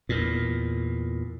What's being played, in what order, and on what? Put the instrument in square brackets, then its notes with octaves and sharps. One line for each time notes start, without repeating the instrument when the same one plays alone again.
[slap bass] E2 A#2